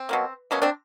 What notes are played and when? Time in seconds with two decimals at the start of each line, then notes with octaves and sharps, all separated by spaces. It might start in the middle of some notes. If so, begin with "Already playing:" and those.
Already playing: C4
0.09 B2 F#3 A#3
0.51 B2 F#3 A#3 B3 C#4
0.62 C4 D4